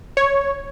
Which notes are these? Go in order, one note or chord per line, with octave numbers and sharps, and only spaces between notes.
C#5